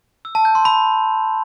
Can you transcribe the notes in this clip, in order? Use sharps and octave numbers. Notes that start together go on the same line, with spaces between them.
E6
A5
G6
C6
B5